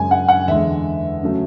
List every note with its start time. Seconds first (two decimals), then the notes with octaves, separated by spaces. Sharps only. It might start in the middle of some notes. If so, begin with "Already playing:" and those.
Already playing: F#2 C#3 G#3 G#5
0.11 F#5
0.28 F#5
0.48 E2 D3 G#3 E5
1.23 C#3 F#3 A3